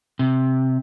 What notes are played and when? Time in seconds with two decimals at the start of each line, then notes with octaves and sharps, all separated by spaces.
0.19 C3